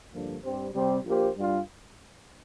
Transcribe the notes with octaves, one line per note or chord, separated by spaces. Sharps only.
G2 D3 F3 A#3 D4
G2 G3 C4 G4 C5
C3 G3 C4 G4 C5
A#1 A#2 A#3 G4 C5
G2 G3 D4 F4